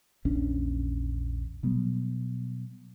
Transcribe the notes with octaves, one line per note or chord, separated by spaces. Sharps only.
A#1 E2 C#4 D4
B2 F#3 G3 B3